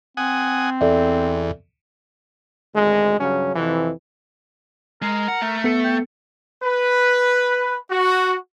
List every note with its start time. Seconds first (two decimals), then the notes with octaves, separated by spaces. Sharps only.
0.17 C4 F#5 G#5 D#6
0.81 E2 A4 D5 E5
2.74 G#1 D2 G#3
3.19 G2 C#3 F#3 C#4
3.55 F2 C3 E3
5.02 G#3 A#4
5.28 F#5
5.42 A3
5.64 B3 A4 C#7
5.84 G5
6.64 B4
7.91 F#4